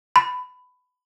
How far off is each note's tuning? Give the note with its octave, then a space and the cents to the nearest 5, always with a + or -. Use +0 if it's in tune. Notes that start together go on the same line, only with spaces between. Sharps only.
B5 +15